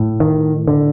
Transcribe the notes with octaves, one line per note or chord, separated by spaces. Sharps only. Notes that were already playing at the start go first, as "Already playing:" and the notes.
Already playing: A2
D#3
D3